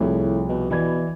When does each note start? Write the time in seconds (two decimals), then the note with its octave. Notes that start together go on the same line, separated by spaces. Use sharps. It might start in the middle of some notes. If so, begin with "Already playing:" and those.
0.01 C2 A2 F3 G#4
0.49 B2
0.71 B2 E3 D5 G#6